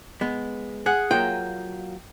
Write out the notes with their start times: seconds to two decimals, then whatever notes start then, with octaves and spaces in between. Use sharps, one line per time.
0.21 G#3 B3
0.86 G#4 F#5
1.11 F#3 A#3 F4 G5